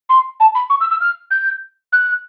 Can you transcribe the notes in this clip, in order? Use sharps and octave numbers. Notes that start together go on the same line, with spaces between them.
C6
A5
B5
C#6
E6
E6
F6
G6
F#6